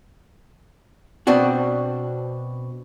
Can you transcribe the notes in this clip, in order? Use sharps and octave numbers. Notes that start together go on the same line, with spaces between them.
B2 C4 D4 F#4